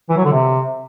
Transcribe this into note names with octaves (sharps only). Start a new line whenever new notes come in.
E3
F#3
D3
C3